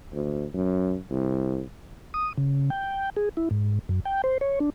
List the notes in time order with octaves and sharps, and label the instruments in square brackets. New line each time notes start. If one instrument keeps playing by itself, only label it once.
[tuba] D2
F#2
C2
[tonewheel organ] D#6
C#3
G5
G#4
E4
G#2
F#2
G5
C5
C#5
D4